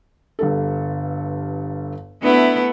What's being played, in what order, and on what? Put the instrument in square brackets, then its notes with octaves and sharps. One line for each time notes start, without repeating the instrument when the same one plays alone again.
[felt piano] G1 G2 A4
[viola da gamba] A3 B3 E4 [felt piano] D4